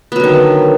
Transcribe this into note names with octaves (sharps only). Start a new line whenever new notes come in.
D3 D#3 F#3 B3